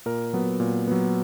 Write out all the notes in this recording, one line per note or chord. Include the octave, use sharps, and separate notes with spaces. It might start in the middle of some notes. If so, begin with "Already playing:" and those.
A#2 A#4
F#3 B3
A#2
F#3 B3